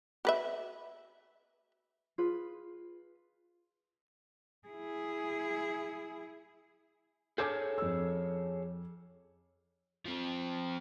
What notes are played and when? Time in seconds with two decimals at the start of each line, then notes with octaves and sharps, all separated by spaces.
0.25 F#4 B4 E5
2.18 F4 G#4 B4
4.68 E4 G#4
7.38 G#4 A4 C#5 G#5 D6 G6
7.78 F2 E6
10.05 F3 C4